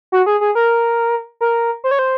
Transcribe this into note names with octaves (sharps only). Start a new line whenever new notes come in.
F#4
G#4
G#4
A#4
A#4
C5
C#5
C5